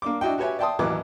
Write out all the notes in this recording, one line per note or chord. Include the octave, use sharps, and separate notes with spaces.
A#3 D4 D6
D4 E4 F#4 D#5 G5
F#4 G4 B4 C#5 E5 G#5
D5 E5 G5 A5 C6 D#6
A1 D#2 E3 F#3 D6